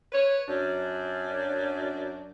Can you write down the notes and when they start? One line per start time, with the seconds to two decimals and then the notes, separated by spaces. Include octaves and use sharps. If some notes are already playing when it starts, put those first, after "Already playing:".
0.12 B4 C#5
0.47 F#2 D4